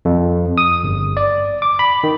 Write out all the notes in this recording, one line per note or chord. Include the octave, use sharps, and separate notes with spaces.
F2
D#6
G1
D5
D6
B5
D#3